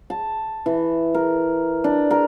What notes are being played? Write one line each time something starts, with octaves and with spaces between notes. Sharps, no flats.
A5
E3
A#4
D4
A#4